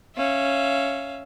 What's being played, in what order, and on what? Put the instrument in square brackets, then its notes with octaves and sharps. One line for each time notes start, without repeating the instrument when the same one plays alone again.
[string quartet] C#4 E5 F5